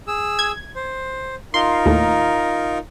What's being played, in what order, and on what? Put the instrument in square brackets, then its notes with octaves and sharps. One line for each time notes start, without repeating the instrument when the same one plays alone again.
[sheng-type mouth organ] G#4 E6
[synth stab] G#6
[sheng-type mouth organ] C5
[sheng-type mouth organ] D#4 F4 A#4 [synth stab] C6
[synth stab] D#2 A2